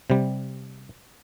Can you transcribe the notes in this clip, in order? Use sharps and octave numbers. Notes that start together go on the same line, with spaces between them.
C3 G3